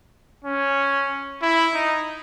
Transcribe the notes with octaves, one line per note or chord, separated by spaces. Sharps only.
C#4
E4
D#4